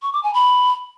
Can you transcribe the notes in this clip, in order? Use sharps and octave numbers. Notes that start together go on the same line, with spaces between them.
C#6
D6
G#5
B5